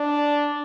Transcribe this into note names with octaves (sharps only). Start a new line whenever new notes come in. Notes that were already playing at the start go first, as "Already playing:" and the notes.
Already playing: D4